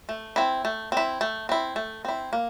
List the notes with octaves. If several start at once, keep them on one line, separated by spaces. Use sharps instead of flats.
A3
C4 E4
A3
C4 E4
A3
C4 E4
A3
C4 E4
A#3